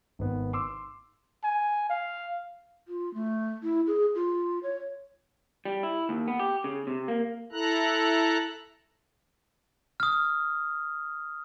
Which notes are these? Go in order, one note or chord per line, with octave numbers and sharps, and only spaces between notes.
G#1 B3
C6 D6 E6
G#5
F5
F4
A3
E4
G#4
F4
C#5
G3
E4
D#2
B3
G4
C#3
C3
A#3
E4 A4 A#5 F#6
D#6 F6